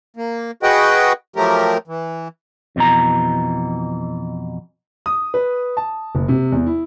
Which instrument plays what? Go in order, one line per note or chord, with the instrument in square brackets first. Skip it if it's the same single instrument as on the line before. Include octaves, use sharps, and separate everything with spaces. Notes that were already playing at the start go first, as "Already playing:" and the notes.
[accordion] A#3
F#4 G#4 B4 D#5 F#5 G5
F3 F#3 A3 G4 A#4
E3
[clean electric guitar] F2 B2 E3 A#5
[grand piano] D#6
B4
A5
F#1
C3
E2
E4